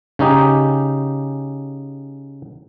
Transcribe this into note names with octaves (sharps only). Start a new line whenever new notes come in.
C#3 C#4 D#4 G4